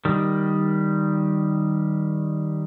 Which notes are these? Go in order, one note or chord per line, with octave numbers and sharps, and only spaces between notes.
D#3 G3